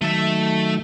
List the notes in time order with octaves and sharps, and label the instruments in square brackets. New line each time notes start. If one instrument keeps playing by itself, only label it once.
[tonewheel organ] D#3 F#3 [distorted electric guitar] A3 E5